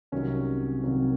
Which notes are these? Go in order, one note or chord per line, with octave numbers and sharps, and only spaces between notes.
C2 C3 D#3 F#3 A#3 C#4
C2 C3 D#3 F#3 A#3